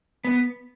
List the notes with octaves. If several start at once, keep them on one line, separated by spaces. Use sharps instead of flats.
B3